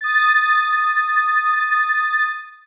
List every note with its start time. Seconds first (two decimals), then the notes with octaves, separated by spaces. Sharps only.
0.01 D#6 A6